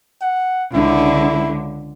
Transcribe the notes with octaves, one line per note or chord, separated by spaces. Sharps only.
F#5
C#2 D3 E4